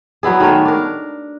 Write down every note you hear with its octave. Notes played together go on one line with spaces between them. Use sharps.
F#3 B3 E4 G#4
D#3 G#3 A3 C#5
D4 A#4